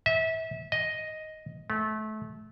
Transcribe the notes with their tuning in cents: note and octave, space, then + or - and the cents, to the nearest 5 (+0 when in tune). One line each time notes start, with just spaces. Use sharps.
E5 -30
D#5 +5
A3 -25